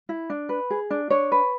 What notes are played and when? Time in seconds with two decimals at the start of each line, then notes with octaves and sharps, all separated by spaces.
0.09 E4
0.30 D4
0.49 B4
0.70 G#4
0.90 D4
1.10 D4 C#5
1.32 B4